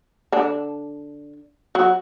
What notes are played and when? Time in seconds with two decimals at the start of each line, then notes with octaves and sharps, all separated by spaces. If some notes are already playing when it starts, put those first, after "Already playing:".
0.32 D3 D4
1.75 F#3 F#4